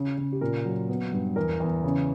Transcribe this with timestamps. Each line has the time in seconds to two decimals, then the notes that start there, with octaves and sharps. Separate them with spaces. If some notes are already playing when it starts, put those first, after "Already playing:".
Already playing: C#3
0.17 C#3
0.32 G4
0.41 A#2 A#4
0.65 F#3
0.89 B3
1.12 G2
1.36 E2 A#4
1.60 E2
1.84 C#3